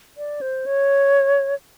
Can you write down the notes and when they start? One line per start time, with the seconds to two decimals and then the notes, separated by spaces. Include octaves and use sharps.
0.17 D5
0.41 C5
0.66 C#5